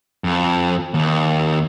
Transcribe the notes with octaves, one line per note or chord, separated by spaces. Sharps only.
F2
D#2